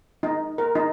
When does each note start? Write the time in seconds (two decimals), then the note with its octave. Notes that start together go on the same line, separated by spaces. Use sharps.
0.23 D#4
0.58 A#4
0.75 D#4